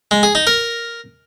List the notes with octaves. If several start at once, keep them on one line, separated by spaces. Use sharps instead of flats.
G#3
G#4
D#4
A#4